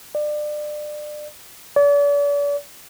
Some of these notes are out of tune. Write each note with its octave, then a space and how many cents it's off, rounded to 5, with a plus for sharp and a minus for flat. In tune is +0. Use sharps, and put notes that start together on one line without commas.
D5 +30
D5 -40